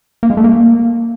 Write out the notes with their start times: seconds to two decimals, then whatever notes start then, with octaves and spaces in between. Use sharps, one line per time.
0.23 A#3
0.30 G#3
0.37 A3
0.44 A#3